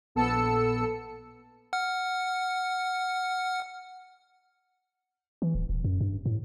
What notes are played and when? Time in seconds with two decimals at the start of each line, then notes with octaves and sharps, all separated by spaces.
0.15 A#1 B3 A4 E6 C#7
1.73 F#5 F6
5.42 E3
5.55 D1
5.69 D#1
5.84 F#2
6.01 G2
6.26 A2